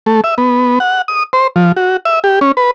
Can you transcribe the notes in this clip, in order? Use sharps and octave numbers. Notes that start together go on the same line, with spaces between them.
A3
E5
B3
F#5
D#6
C5
F3
F#4
E5
G4
C#4
B4